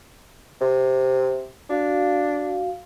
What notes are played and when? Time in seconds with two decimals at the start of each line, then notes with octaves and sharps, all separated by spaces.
0.61 C3
1.70 D4 F#4 F5